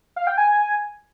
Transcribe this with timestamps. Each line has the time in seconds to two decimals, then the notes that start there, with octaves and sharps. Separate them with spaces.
0.16 F5
0.27 G5
0.38 G#5